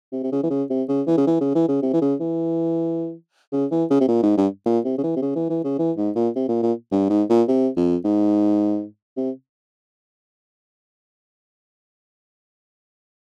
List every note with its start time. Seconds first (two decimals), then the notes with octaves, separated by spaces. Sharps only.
0.13 C3
0.24 C3
0.32 C#3
0.43 E3
0.50 C#3
0.70 C3
0.89 C#3
1.07 E3
1.17 C#3
1.27 E3
1.41 C#3
1.55 E3
1.68 C#3
1.82 C3
1.93 E3
2.02 C#3
2.20 E3
3.52 C#3
3.71 E3
3.90 C#3
4.01 C3
4.08 A#2
4.23 G#2
4.37 G2
4.66 A#2
4.85 C3
4.98 C#3
5.03 E3
5.16 C3
5.22 C#3
5.35 E3
5.50 E3
5.64 C#3
5.78 E3
5.97 G#2
6.16 A#2
6.36 C3
6.48 A#2
6.63 A#2
6.92 G2
7.10 G#2
7.29 A#2
7.48 C3
7.76 F2
8.05 G#2
9.17 C3